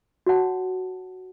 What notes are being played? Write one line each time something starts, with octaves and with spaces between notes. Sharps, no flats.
F#4 C#5 F#5 A5